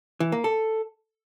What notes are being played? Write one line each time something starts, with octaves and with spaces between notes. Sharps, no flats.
E3
A#3
A4